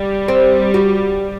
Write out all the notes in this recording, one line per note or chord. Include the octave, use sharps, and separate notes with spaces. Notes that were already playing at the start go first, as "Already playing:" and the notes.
Already playing: G3
C4
F#4